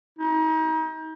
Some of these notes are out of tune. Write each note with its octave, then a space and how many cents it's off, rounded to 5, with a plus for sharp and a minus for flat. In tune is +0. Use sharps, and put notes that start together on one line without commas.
D#4 +35